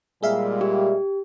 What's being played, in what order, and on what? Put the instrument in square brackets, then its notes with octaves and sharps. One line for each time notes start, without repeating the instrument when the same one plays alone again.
[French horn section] A#2 G3 G#3 [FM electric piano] G#4 E5 F5
[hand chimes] G4